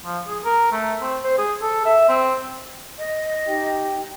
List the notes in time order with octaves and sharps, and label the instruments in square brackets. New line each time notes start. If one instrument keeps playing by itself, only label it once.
[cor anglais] F3
G#4
A#4
A3
C4
C5
G#4
A4
E5
C4
[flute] D#5
[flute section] D#4 G4 G5